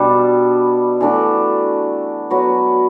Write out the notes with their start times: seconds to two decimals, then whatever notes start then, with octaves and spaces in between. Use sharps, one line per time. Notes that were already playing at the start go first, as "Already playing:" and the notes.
Already playing: B2 G3 D4
1.00 E3 A3 D4 F#4
2.31 F#3 B3 F#4 B4